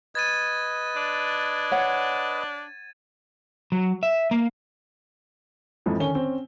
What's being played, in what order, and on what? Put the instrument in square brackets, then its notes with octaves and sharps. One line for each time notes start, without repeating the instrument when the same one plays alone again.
[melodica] B4 D#5 [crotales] G#6 A6 D#7
[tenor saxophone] D4
[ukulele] C#5 F#5
[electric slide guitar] F#3
E5
A#3
[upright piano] F2 G#2 E3 F3
D3 D#3 C#4 G#5 G7
C4 C#4